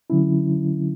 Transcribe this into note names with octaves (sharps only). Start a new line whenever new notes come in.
D3 F#3 C#4 E4